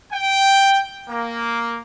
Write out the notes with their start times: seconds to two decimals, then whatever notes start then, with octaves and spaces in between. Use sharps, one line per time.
0.12 G5
1.09 A#3